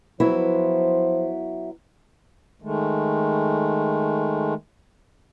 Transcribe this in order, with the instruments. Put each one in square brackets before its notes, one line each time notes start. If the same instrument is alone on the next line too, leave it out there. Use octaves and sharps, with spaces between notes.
[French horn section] F3 C5 [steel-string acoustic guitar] F#3 B3 E4
[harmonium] D#3 G#3 A3